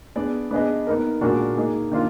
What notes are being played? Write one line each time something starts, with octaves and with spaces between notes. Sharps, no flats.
B3 D4 G#4 D5
B3 D4 G#4 B4 D#5
B3 D#4 A#4
A#2 G#3 D4 F#4 A#4
A#3 D#4 G#4
D#3 A#3 D4 F4